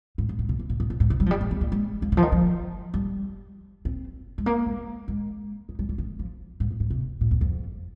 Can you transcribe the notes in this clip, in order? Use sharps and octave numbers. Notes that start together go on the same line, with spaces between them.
G#2
G2
G#2
C3
C3
A#2
A#2
A#2
G#2
C3
G3
F3
G3
G#3
C4
A#3
G#3
F3
D#3
F3
D#3
F3
G3
C4
G#3
A#3
G#3
G#3
G#3
G3
G3
D#3
F3
G#2
G2
G#2
C3
A#2
F2
F2